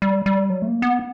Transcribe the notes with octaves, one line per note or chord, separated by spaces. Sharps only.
G3
G3
F#3
A3
A#3
B3